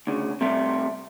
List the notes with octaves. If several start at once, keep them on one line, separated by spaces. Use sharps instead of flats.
D2 C#3
C3 G3 A3 E5